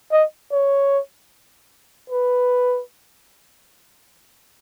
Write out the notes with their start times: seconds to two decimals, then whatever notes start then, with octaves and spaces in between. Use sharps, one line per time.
0.12 D#5
0.52 C#5
2.10 B4